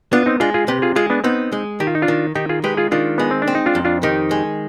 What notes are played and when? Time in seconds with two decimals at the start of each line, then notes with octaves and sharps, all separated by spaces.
0.13 B3 D4 F4
0.26 C4 D#4
0.40 G#3 D4 F4
0.54 F4 G#4
0.68 C3 G4 B4
0.82 F4 G#4
0.96 G#3 F4 G#4
1.10 B3 D4
1.24 B3 C4 D#4
1.52 G#3
1.80 D#3 G4
1.87 F4
1.95 D#4
2.02 D4 F4
2.08 D#3
2.35 D#3 D#4 G4
2.49 F4 G#4
2.64 G#3 G4 B4
2.77 F4 G#4
2.92 D#3 D4 F4
3.18 G#3 B3
3.31 C4
3.42 D4
3.47 C4
3.55 D#4
3.66 D4 F4
3.75 F2
3.85 D4 F4
4.03 D#3 D#4 G4
4.31 G#3